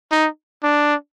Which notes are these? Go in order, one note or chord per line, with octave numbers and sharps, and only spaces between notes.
D#4
D4